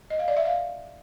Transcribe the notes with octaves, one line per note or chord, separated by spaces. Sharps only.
D#5
F5
D5
E5
F5